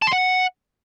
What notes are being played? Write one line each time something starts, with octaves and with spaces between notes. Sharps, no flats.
A5
C6
F#5